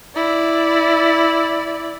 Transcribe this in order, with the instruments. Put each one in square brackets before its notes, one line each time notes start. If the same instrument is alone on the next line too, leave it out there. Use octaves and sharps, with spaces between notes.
[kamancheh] E4 D5